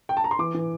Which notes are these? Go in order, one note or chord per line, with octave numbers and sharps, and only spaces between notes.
G5
A5
A#5
C6
E3 D6
E3